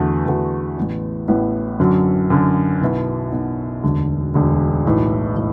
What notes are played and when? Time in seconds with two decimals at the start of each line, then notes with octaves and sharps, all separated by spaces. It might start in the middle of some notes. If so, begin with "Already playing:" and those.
Already playing: E2 D3 A3 F#4
0.26 E2 D3 A3 F#4
0.77 A1 A2 E3 B3 E4
1.28 A1 A2 E3 B3 E4
1.80 F#2 D3 F#3
2.30 F#2 D3 F#3
2.81 B1 B2 B3 E4
3.32 B1 B2 B3 E4
3.84 E1 D2 D3
4.34 E1 D2 D3
4.85 B1 A2 E3
5.36 A2 E3